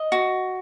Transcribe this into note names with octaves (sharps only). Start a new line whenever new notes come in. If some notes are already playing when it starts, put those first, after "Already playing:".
Already playing: D#5
F#4